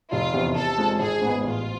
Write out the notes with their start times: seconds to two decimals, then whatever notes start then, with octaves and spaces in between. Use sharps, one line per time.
0.11 F1 F4
0.34 E2 C3
0.56 C3 A4
0.78 G#3 C4 F4
0.99 G#1 G#4
1.22 G#2 G#3 B3
1.44 A1 F4